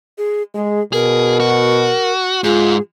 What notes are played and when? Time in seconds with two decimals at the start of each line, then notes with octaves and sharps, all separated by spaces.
0.18 G#4
0.55 G#3 G#4
0.93 B2 G#4 A#4
1.40 F#4
2.44 G#2 F4 G#4